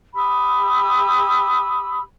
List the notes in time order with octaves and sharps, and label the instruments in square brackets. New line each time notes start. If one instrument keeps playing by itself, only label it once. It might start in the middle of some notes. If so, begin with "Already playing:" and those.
[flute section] G4 B5 D#6 E6